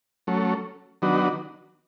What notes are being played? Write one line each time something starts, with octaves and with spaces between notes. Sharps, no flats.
F#3 A3 C#4
D#3 F#3 B3 D4 F#4